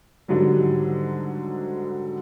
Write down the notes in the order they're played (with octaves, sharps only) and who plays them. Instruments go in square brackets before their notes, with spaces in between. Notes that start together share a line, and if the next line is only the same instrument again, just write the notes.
[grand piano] G#2 D3 D#3 F#3 G3